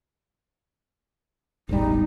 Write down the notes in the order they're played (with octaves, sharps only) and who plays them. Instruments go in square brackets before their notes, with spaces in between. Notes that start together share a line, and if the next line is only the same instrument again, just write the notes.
[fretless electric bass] E1 A1 G3 [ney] D#4